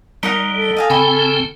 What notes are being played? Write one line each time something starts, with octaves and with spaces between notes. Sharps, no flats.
G3 D#4 A#4 F#5
A4
D#5 F5 G#5
C#3 C4 G5 G#5 B5 C#6